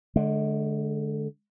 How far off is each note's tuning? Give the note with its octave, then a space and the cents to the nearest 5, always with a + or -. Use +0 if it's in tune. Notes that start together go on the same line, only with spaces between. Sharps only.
D3 +0 G#3 +35